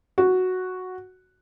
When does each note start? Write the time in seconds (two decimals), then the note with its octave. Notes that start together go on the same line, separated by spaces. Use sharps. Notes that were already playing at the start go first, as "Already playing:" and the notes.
0.18 F#4